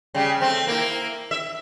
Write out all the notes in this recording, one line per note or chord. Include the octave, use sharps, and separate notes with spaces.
C#3 G3
A3 C4
A#3 E4
E5